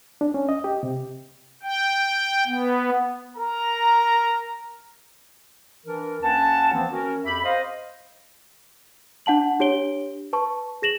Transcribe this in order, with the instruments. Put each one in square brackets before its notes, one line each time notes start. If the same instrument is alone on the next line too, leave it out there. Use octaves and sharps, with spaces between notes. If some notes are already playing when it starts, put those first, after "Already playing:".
[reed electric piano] D4
C#4
D#5
G4
C3
[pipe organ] G5
B3
[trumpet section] A#4 A#5
[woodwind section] E3 D4 A#4
D#2 C#4 F#5 A5
E3 F3 A#3 C4
C#4 F#4 A#4
F2 G4 E5 B5
C5 D#5 F5
[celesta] D4 F#5 A5 F#7
D4 G4 C#5 D7 G7
B4 A5 C#6
G#4 A#6 E7 F#7